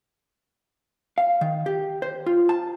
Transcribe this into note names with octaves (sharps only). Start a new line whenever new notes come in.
F5
D#3
G4
C5
F4
A5